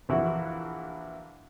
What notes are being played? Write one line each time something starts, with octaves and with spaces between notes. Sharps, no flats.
A#1 E3 E4 F#4